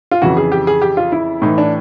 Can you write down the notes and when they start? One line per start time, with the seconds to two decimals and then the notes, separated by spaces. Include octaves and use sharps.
0.11 F4
0.22 F2 C#3 E3 F#4
0.37 G#4
0.52 G4
0.67 G#4
0.82 G4
0.97 F4
1.12 E4
1.42 A2 E3 D#4
1.58 D4